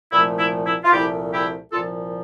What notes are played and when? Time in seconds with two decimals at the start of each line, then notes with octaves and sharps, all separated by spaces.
0.12 C2 A#2 F3 A3 E4
0.38 E4
0.65 E4
0.84 F4
0.91 C2 A#2 F3 A3 E4 G4
1.32 E4 G4
1.72 C2 A#2 F3 F4 A4